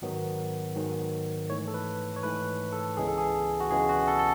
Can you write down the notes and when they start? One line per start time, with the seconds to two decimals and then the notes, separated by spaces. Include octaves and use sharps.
0.02 G#2 D#3 F#3 B3
0.76 G#2 D#3 F#3 B3
1.50 G#2 E3 A3 C#5
1.68 A4
1.74 B4
2.16 C#5
2.23 G#2 E3 A3 B4
2.72 A4
2.97 C#2 C#3 E3 G#3 B3 G#4
3.08 A4
3.18 G#4
3.60 F#4
3.71 C#2 C#3 E3 G#3 B3 G#4
3.89 F#4
4.08 A4
4.19 A4